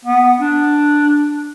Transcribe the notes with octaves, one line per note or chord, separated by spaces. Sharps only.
B3
D4